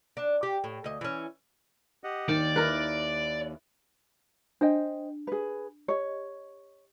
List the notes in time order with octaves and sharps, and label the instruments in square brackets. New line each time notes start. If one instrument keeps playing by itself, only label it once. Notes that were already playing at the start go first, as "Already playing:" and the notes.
[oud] D4
G4
A2
D2 D#5
E3 C#4
[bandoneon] G4 D#5 F#5
[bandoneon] D#2 [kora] D#3 [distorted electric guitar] D5
[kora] E4 A#4 B4
[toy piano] D4 [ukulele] C5 D#5 G5
[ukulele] G#4 B4
[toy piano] G4 D#5 [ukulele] C#5